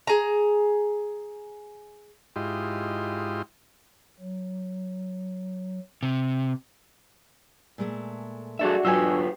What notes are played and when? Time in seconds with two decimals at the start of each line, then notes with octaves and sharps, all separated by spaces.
0.07 G#4 A#5
2.36 G#2 E4 F4 G4 D#5 C6
4.20 F#3
6.03 C3
7.78 A#2 G#3 A3
8.59 D4 F#4 G#4 A4 E5
8.85 F#3 F4 G4 B4 C#5 G#5 E6